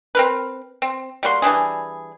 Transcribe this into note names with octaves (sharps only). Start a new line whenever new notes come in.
C4 A#4 B4
C4
G3 A#3 F#4 C6
E3 G3 D4 G#4